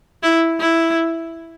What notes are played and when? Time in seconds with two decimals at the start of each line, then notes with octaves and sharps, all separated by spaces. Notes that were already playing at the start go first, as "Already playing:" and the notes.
0.23 E4
0.60 E4